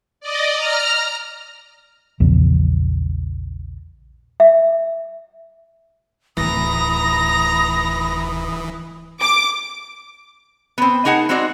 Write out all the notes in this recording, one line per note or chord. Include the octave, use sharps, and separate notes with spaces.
D5 D#5
A#5 F6
A#1 E2 C#3
E5
D1 A2 E3 A#5 B5 D#6 A#6
D6
B3 C4
A#3 D#4 G#4 F#5 A5
G#3 C4 D#4 F#4 D5